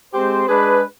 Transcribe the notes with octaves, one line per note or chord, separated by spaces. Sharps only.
G#3 C4 G4 C5
G#3 D4 G#4 B4